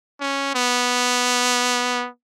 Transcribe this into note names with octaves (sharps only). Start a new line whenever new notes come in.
C#4
B3